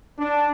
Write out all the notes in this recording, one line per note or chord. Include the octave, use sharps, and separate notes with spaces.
D4